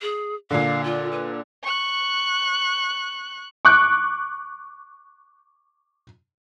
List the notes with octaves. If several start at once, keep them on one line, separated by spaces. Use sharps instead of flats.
G#4
A#2 D3 F5
F4
B4
C#6 F#6
C#6 D6 F#6